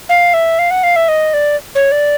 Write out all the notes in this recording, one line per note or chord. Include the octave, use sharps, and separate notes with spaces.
F5
E5
F5
F#5
F5
E5
D#5
D5
C#5
D5